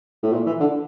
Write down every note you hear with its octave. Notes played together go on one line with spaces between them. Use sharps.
A2
A#2
E3
D3